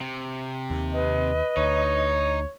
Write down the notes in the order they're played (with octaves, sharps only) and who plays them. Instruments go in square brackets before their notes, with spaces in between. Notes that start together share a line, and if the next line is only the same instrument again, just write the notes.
[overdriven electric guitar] C3
[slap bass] D#2
[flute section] B4 D#5
[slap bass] D2 [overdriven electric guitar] D#4 [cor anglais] C#5